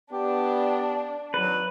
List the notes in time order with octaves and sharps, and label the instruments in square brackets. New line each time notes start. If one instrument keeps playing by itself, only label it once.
[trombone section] B3 [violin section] D4 [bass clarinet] G4
[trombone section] G#1 [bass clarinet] F#3 [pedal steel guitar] B4